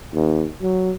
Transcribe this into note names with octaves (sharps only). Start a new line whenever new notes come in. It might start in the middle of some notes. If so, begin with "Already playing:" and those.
D#2
F#3